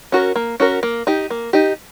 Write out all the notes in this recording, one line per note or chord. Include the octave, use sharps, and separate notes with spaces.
C#4 F#4 A#4
A#3
C#4 F#4 A#4
A#3
D#4 G4
A#3
D#4 G4